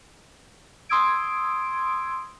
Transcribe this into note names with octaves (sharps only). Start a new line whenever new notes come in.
C6 D#6 E6 G#6 D7